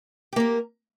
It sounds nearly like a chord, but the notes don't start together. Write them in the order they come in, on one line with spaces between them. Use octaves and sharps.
G4 A#3 A#4